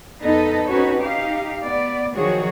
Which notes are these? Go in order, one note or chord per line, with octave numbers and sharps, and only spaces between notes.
F2 B3 D#4 A4 B4 D#5
C4 C#4 D#4 F#4 B4 C#5
D#4 G4 F5
B3 D5
D#3 F3 F#3 F#4 G#4 C#5